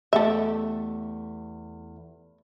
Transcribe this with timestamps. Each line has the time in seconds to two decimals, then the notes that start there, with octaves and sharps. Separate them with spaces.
0.13 E2 A3 G4 A4 E5